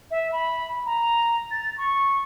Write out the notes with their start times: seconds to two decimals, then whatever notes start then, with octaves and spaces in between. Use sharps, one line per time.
0.11 E5
0.32 B5
0.86 A#5
1.51 A6
1.78 C#6